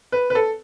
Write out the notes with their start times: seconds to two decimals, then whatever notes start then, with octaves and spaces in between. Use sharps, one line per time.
0.12 B4
0.30 B4
0.35 A4